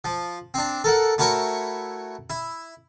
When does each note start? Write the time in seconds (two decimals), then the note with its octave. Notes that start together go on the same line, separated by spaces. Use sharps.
0.04 F3
0.54 C4 D4
0.84 A4 A#4 F#5
1.18 A3 E4 F#4 A#4 C#5 C#6
2.30 E4